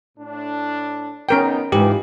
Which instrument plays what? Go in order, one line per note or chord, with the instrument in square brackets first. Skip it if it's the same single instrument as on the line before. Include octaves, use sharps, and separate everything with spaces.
[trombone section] A2 D4
[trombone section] B3 D#4 [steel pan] C#4 A#4 G5
[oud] G#2 E3 B4 [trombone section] D#4 F4 [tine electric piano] G4